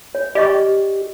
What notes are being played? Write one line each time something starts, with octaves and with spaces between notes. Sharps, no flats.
C#5
G4 D5 D#5 C#6